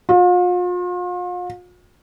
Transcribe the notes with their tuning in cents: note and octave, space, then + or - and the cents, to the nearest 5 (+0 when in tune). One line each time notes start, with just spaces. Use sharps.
F4 +40